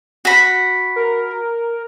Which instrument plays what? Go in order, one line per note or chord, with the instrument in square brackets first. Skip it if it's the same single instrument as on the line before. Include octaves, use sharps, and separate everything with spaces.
[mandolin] F#4 B5
[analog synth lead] A#4